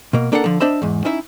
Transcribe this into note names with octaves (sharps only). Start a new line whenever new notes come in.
B2 A#3
A#3 D4 A4 A#4 F5 F#5
D3 F3
D4 C5 D#5 E5 B5
E2 G#2
C#4 D#4 E4 E5